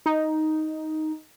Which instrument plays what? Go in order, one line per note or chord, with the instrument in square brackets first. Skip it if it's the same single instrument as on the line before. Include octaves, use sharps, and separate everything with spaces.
[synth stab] D#4